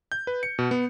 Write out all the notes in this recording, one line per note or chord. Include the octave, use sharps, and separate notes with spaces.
G6
B4
C#7
B2
B3